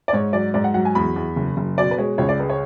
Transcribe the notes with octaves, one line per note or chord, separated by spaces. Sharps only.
D5
G#2 C#5
F#3 D5
G#2 D5
F#5
F#3 F#5
G#5
E2 B5
E2
F#1
F#1
B2 D5
B4
G#3 C#5
C#2 C#5
D5
G#3 B4
C#5